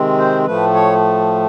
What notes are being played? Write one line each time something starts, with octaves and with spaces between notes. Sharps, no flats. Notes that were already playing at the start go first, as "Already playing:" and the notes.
Already playing: C3 D#3 G#3 C4
C5
A2 F3 A3 B4
C#5